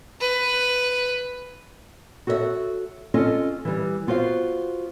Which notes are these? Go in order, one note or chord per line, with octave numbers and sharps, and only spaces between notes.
B4
F#4 A4 C#5 D#5 E5
C#4 F4 A4 D5 D#5
E3 G3
B3 F4 F#4 C5 F5